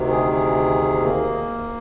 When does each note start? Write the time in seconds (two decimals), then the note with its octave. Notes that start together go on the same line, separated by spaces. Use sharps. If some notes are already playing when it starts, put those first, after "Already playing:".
Already playing: D2 C3 D#3
0.09 G#4
0.32 G#4
1.00 A#3